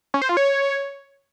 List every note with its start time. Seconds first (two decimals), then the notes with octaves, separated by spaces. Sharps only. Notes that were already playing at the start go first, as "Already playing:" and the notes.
0.14 C#4
0.22 C5
0.29 F4
0.37 C#5